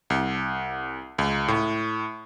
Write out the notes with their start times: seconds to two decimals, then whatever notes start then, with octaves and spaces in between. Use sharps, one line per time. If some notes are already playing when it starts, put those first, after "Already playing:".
0.10 C2
1.18 C#2
1.48 A2